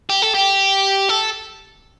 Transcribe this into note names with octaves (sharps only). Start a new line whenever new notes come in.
G4
A4
G4
A4